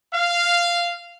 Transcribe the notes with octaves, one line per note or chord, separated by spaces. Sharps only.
F5